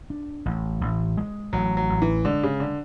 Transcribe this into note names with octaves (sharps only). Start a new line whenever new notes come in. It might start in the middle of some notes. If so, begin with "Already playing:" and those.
D4
A1
A1
G#3
A1 F#3
F#3
A1
E3
D3 G#3
C#3
D3